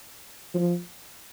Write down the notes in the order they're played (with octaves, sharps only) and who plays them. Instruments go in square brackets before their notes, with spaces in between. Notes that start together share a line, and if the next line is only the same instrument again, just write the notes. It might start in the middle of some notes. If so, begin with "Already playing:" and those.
[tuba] F3